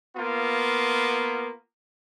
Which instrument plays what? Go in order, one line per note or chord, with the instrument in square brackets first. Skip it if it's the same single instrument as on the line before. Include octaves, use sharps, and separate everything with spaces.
[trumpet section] A#3 B3 F4